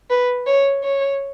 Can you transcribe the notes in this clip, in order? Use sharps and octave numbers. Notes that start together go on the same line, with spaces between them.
B4
C#5
C#5